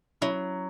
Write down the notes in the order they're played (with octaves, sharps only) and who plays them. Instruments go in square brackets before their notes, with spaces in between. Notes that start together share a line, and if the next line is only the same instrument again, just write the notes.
[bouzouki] F#3 [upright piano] C#4 E4